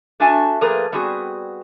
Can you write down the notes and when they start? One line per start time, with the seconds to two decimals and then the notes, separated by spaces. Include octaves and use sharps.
0.20 A3 D4 F#4 E5 G#5 A5
0.61 F3 A3 A#3 G#4 A#4 B4
0.92 G3 B3 C4 F#4 G#4